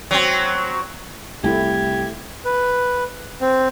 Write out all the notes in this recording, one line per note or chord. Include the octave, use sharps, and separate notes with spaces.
F#3 C4
C2 A3 E4 G4 G#6
B4
C4